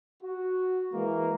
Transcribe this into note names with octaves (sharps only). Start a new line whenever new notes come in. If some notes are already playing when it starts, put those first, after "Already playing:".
F#4
E3 G#3 A#3